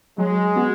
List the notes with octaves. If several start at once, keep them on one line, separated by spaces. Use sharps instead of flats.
F#3 G#3
B3 F#4